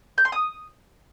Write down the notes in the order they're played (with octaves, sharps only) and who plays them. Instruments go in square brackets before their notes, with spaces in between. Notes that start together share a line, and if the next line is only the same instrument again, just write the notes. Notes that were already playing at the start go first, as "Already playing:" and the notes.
[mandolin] G6
C6
D#6